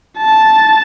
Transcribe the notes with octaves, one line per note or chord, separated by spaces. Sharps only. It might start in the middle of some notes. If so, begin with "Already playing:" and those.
A5